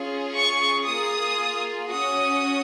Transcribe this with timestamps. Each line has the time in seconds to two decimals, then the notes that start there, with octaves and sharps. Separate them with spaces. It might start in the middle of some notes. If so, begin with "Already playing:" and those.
Already playing: C#4 F4 G#4
0.35 C#6
0.87 A#3 F4 G#4 D#6
1.90 C#4 F#4 D#6